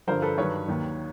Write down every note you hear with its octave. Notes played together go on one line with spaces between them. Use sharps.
G2 D3 F3 A#4 C5
A4 B4
G2 D#3 F#3 B4 C#5
D#2 D#3 F#3